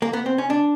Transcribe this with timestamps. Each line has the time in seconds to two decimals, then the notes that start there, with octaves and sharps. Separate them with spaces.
0.02 A#3
0.13 B3
0.26 C4
0.38 C#4
0.50 D4